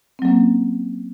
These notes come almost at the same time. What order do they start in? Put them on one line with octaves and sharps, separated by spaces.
C4 F#3 A#3 C#4